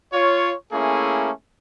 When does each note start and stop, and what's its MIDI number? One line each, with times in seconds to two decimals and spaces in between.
0.13 0.53 65
0.13 0.53 73
0.73 1.31 57
0.73 1.31 58
0.73 1.31 61
0.73 1.31 64
0.73 1.31 68